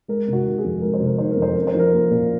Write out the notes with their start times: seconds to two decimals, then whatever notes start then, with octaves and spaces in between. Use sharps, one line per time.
0.08 G#3 A#4
0.28 C3
0.33 F#4
0.45 D#3
0.58 G#4
0.64 F2
0.82 G#3 A#4
0.94 C5
1.00 C3
1.06 A#4
1.18 D#3 C5
1.31 A#4
1.37 F2
1.42 C5
1.55 C#4 A#4
1.67 C5
1.74 F3 A#4
1.93 A#3
2.11 A#2